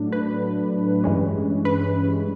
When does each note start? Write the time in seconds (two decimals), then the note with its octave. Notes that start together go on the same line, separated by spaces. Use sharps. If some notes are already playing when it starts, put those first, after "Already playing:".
Already playing: A2 F#3 A3 D4
0.12 B4
1.04 G2 E3 G#3 C#4
1.65 B4